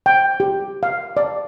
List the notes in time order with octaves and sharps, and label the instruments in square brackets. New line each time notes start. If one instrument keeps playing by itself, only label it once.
[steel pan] G5
G4
F5
D5